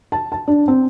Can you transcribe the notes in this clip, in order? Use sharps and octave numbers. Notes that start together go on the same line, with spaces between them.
A5
A5
D4
C4